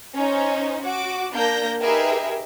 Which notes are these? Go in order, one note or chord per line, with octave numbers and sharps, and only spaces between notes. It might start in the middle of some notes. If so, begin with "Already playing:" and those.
C#4 D#4 C5
F#4 D6
A#3 D4 G6 A#6
D#4 G4 G#4 A#4 B4 E5